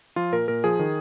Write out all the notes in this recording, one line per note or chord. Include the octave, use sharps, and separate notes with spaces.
F3 F4
A#2 A#4
A#2 A#4
F3 G#4
D#3